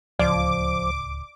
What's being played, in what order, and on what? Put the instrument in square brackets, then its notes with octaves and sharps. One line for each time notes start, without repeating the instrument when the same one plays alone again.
[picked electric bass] D1 C#2 [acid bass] F3 [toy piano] D5 [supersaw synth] D6